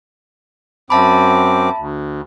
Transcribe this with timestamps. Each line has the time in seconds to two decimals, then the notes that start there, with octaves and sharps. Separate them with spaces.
0.90 F#2 C4 E5 A5 B5 D6
1.78 D2